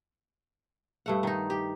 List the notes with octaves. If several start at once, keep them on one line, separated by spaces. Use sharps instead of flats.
G2 A3 F#5
D#3 D#4
G4